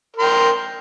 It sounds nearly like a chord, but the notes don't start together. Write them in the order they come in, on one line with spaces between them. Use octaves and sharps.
A#4 C6 G5